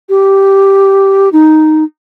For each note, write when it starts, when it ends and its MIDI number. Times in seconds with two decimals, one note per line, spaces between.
0.09 1.29 67
1.33 1.84 63